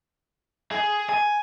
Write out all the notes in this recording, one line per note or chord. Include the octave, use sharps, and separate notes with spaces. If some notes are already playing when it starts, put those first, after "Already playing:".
G#4
G#5